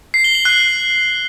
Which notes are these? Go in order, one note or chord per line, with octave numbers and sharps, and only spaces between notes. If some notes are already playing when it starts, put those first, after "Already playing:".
C7
G7
F#7
F#6